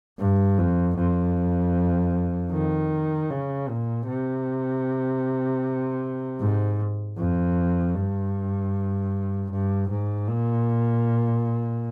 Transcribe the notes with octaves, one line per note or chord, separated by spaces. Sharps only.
G2
F2
F2
D#3
C#3
A#2
C3
G#2
F2
G2
G2
G#2
A#2